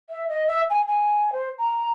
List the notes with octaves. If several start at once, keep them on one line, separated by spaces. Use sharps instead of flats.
E5
D#5
E5
G#5
G#5
C5
A#5